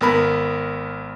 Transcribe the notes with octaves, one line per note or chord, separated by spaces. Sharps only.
G#1 B3 A#4 B5